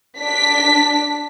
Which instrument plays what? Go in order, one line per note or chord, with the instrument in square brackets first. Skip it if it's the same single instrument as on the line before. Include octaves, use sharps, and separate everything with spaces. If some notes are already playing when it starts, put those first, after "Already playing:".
[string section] D4 B6